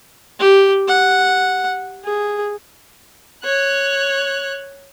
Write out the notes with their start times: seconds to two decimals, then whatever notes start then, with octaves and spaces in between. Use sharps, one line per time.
0.40 G4
0.88 F#5
2.04 G#4
3.44 C#5 F#6